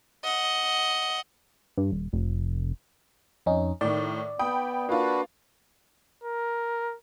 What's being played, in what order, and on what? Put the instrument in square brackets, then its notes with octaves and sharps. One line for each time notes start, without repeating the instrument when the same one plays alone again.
[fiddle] D#5 F#5
[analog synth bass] G2
D#1
F1
[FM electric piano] F2 C#4 D#4
[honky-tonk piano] A2 D#3 [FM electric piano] D5
[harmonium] B3 [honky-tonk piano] G5 B5 D#6
[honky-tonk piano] A#3 F4 [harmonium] D4 F#4 B4
[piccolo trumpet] A#4